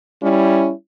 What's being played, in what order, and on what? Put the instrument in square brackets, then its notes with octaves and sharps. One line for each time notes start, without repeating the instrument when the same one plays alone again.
[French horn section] G3 C#4 E4